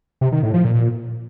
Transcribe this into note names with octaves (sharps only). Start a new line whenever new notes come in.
C3
D#3
A2
F3
A#2